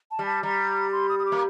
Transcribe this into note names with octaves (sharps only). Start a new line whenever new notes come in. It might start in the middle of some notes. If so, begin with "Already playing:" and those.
A5
G3
A5
G3 A#5
C6
D#6
D#6
D6
A#3